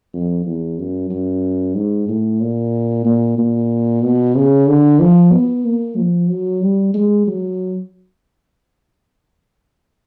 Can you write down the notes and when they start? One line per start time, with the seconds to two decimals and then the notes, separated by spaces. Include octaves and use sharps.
0.14 F2
0.46 E2
0.78 F#2
1.10 F#2
1.75 G#2
2.08 A2
2.41 A#2
3.05 A#2
3.38 A#2
4.03 B2
4.36 C#3
4.68 D3
5.01 F3
5.32 B3
5.65 A#3
5.98 F3
6.30 F#3
6.62 G3
6.94 G#3
7.27 F#3